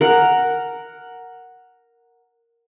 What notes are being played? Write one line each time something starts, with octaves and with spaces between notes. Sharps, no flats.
A#4 F#5